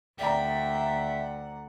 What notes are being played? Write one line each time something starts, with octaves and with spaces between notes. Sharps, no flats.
D2 D5 E5 F#5 G5 A#5